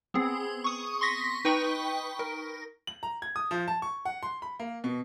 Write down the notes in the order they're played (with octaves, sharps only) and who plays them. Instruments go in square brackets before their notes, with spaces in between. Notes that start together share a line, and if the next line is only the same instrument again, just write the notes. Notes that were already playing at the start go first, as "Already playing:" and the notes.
[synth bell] B3 C4 G#4
C#6 D#6
C6 C#6 A#6 B6
D#4 B4 G5 B5 C#6
A#4
[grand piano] F#7
A#5
G#6
D#6
F3
A5
C#6
F#5
C6
B5
A#3
B2